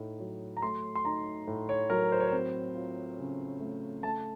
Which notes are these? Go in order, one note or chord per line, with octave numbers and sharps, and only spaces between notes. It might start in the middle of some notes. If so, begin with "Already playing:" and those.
Already playing: A2 D#4
F#3
A#5
A3 C6
C6
D#4 A#5
A2
C#5
F#3 A#4
C5
C#5
C4 C5
F4
C#3
A3
A3 A5